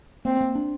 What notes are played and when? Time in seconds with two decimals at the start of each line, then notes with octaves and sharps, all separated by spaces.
0.25 A#3 C4
0.41 A#3
0.55 D4